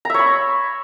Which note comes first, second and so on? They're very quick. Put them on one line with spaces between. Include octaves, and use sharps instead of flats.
A#5 E5 C#5 B5